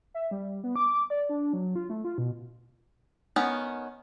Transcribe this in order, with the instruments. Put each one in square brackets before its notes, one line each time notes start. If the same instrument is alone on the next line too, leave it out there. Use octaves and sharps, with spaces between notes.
[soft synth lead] E5
G3
B3
D6
D5
D4
F#3
F4
A3
F4
B2
[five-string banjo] D#3 B3 C#4